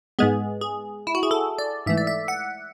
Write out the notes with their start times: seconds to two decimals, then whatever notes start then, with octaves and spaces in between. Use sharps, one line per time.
0.19 G#2 G#3 B3 G#4
0.61 G#4
1.07 E4
1.15 F#4
1.23 G#4
1.31 A4
1.58 D5
1.86 G#2 E3 A3 E5
1.97 D5
2.07 E5
2.28 F#5